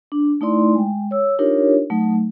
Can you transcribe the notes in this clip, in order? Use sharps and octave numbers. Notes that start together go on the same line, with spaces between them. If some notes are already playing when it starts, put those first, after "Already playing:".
D4
A3 D#4 E4 D5 C6
G#3 G5
C#5 E6
D4 D#4 F4 G4 A#4 C#5
F#3 A3 D#4